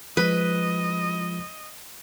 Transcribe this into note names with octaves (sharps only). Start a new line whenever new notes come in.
F3 G#3 B4 D#5